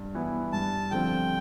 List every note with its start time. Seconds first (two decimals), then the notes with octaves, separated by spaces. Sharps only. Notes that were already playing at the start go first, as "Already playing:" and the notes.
Already playing: G2
0.15 E3 B3 E4
0.53 G2 A5
0.91 D3 F3 C4 G5